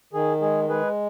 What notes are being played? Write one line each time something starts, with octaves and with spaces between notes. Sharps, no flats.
D#3 G#4
G#3 G#4
G#3 G#4 B4